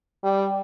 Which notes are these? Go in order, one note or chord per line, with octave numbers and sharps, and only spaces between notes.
G3